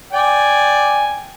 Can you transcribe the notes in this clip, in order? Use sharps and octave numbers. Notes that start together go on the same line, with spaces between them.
D5 G5 G#5